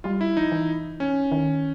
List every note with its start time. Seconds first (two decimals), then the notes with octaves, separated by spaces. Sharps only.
0.04 G3 F4
0.21 E4
0.37 F3 D#4
0.52 E3
1.00 C#4
1.32 D#3